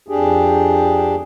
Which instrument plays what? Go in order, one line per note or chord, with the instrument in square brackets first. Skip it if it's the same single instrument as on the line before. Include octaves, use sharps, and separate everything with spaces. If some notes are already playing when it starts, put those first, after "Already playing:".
[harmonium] F2 D4 G4 G#4